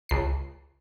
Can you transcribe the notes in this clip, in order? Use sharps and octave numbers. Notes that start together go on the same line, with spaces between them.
C#2 C7